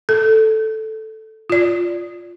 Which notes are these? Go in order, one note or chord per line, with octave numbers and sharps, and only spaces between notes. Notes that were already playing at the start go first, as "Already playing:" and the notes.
A4
F4 D5